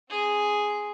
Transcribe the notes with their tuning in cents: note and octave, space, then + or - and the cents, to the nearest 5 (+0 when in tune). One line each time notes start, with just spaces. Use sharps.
C4 +5 G#4 +0